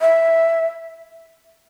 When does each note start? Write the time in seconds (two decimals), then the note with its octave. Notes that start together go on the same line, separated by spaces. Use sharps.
0.01 E5